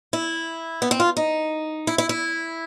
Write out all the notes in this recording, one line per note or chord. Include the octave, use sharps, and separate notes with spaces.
E4
B3
C4
F4
D#4
E4
E4
E4